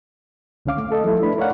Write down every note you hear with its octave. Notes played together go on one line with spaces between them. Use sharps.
C#2 D3 C#4 F5 D6
A3
A3 A4 D#5
F3 G3 A3 E4
D4 B4 B5
E4 A#4 C#5 D5 F5 F#5